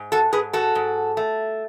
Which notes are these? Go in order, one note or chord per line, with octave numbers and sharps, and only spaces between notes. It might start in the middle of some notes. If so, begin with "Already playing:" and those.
Already playing: G#2
F#4 A4
G#2 G#4 B4
F#4 A4
G#2
A3